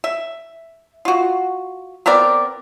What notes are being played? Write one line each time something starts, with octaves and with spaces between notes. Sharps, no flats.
E5
F4 F#4
B3 C4 A#4 D5